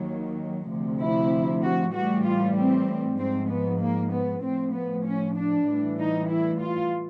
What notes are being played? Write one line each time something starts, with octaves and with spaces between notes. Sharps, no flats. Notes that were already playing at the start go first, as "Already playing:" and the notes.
Already playing: D#2 D#3 F#3
D2 C3 F3
E4
F#4
A2 E3 G3 F#4
F4
C4
G#2 F3 C4
B3
A#3
B3
A2 F3 C4
B3
C#4
D4
A2 E3 G3
D#4
E4
F4